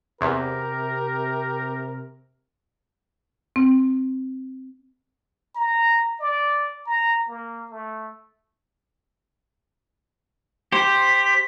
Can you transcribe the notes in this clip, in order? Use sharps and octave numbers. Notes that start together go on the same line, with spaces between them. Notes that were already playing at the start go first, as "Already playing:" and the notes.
E2 C3 G4 A#4
C4
A#5
D5
A#5
A#3
A3
G4 C5 B6